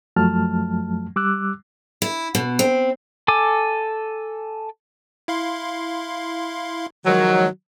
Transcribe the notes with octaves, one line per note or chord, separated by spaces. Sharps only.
F#2 F3 F#3 A3 A5 F6
G3 D6 E6 F#6
E4
B2
C4
A4 G#5 D6
E4 F5 C6
D#3 F3 F#3 G#3